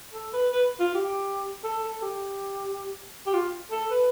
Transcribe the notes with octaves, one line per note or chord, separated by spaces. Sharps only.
A4
B4
B4
F4
G4
A4
A4
G4
G4
F4
A4
B4